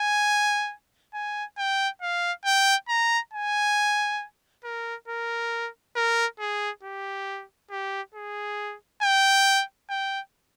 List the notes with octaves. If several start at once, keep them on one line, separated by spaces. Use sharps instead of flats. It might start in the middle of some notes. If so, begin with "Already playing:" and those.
Already playing: G#5
G#5
G5
F5
G5
A#5
G#5
A#4
A#4
A#4
G#4
G4
G4
G#4
G5
G5